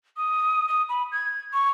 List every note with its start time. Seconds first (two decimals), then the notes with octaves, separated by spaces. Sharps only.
0.17 D#6
0.68 D#6
0.89 B5
1.12 G#6
1.53 C#6